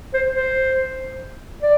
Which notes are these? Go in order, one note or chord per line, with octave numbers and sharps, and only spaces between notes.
C5
C5
D5